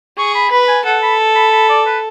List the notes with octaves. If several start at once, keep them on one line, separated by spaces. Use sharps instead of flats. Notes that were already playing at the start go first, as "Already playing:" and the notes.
G#4 C#6
B5
B4 B5
G#5
A4 F#5
B5
B5
B5
D5
B4